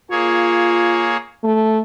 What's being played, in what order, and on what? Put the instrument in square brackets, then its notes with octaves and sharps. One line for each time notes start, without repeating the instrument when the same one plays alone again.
[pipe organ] A#3 G#4 C#5 [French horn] F4
[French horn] A3